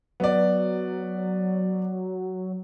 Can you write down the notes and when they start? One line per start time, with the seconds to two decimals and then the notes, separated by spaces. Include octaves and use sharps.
0.20 F#3 B3 D5